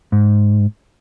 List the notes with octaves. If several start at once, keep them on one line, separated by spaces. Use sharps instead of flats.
G#2